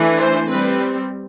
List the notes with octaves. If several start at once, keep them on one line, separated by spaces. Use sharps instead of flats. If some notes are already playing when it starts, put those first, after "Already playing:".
Already playing: E3 A3 D4
C5
G3 C4 B4